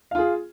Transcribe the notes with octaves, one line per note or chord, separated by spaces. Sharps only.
F4 G#4 F5